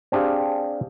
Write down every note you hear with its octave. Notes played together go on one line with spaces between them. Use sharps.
C4 D4 G4 G#4 F5